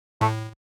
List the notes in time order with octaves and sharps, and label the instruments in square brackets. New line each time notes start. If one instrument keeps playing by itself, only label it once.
[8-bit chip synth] A2 [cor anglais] A3